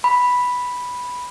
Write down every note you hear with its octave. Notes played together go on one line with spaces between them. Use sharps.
B5